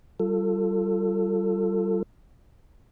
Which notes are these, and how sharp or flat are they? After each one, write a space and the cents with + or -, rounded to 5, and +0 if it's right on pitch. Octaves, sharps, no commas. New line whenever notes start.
G3 -30 F4 +0 A4 +20